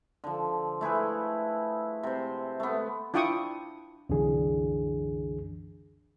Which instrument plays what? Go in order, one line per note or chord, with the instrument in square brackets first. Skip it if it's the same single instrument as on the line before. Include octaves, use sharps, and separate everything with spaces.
[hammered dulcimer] D3 F3
A3 E4 G#4 B4
C3 C5
A3 B3
[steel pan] D4 E4 F4 G5 C#6 D#6
[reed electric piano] C2 F#2 D3 E3 D4 G#4